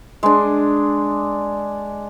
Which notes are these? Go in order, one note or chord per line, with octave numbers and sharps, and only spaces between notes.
G#3 D4